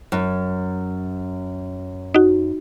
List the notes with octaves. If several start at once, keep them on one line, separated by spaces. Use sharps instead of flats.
F#2
D#4 F#4